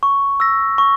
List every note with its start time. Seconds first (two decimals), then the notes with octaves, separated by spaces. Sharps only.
0.03 C#6
0.40 E6 A#6
0.78 C#6